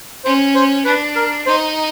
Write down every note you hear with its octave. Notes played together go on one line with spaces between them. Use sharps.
C#4 C5
C5
D4 B4
A#4
D#4 C5